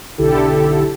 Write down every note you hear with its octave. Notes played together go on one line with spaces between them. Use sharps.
B1 D3 E4 G4 A4